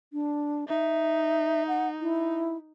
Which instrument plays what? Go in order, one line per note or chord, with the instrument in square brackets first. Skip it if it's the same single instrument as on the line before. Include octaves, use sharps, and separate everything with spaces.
[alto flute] D4
[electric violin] D#4 [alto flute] E5
[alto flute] F#5
E4